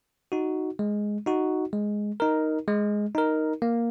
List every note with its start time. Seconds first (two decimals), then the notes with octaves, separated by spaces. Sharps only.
0.32 D#4 F#4
0.79 G#3
1.26 D#4 F#4
1.73 G#3
2.20 D#4 A#4
2.68 G#3
3.15 D#4 A#4
3.62 A#3